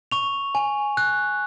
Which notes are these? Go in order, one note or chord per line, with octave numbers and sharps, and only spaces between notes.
C#6 F7
G#5
F#6